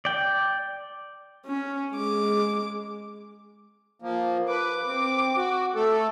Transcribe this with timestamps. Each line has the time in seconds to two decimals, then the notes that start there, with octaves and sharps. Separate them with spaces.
0.05 D5 G5
1.46 C#4
1.94 G#3 D6
4.02 F3 A#3
4.49 B4 D6
4.87 C4
5.37 F#4
5.75 A3 A4